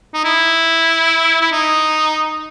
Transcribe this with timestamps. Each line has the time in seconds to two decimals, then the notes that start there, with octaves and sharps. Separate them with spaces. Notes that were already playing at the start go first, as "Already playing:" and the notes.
0.14 D#4
0.24 E4
1.41 E4
1.52 D#4